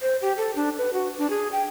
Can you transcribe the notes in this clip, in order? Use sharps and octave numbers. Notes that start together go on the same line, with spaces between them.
C5
G4
A4
D4
B4
F#4
D4
G#4
G5